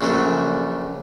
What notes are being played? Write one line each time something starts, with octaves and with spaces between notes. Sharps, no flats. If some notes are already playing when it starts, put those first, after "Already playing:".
A#1 C#3 F#3 A3